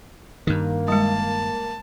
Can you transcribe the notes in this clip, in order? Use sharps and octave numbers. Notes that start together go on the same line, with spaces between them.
G2 D#3 A#3
G3 G#3 A5